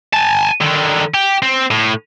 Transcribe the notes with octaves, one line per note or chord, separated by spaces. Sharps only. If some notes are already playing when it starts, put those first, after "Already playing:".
G#5 A5
D3 D#3
G4
C4
A2